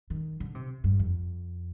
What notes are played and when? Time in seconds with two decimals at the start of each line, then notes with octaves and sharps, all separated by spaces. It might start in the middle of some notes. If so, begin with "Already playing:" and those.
0.10 D#3
0.40 D3
0.55 C3
0.84 G2
0.99 F2